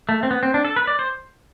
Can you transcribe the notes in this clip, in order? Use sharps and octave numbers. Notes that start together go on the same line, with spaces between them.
A3
C4
B3
C4
D4
A4
B4
D5
C5